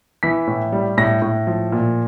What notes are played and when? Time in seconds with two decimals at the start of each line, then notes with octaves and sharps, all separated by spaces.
0.23 E3 B6
0.47 A2
0.72 G3
0.97 A2 A#6
1.22 A2
1.47 F3
1.72 A#2